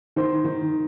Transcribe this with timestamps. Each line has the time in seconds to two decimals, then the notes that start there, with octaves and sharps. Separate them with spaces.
0.16 D#3 C5
0.44 D#3